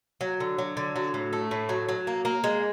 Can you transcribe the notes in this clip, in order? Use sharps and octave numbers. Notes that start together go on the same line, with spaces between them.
F#3
D3
F#3
D3
F#3
A2
A3
A2
F#3
F#3
A#3
A#3
G#3